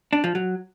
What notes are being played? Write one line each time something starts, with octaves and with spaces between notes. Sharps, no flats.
D4
F3
F#3